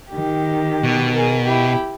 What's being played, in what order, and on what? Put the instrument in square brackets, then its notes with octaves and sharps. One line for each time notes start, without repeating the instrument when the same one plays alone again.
[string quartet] D#3 G4
[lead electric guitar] B2
[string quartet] G#4 A#4
E4 G4